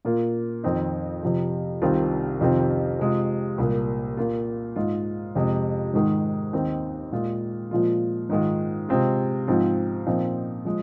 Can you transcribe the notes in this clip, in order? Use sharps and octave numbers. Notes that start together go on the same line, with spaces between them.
A#2 A#3 F4
F2 D#3 C4 D#4
F2 C3 F3
C2 C3 D#3 C4 F4
F2 C3 D#3 C4 F4
C3 G#3 F4
C2 A#2 A#3
A#2 A#3 F4
G#2 G#3 F4
F2 C3 G#3
G#2 D#3 G#3
D#2 D#3 C4 D#4
A#2 G#3 F4
A#2 F3 G#3 F4
G#2 D#3 G#3 F4
C3 G#3 C4 F4
G#2 F3 C4 F4
A#2 F3 C4 D#4
F3 G#3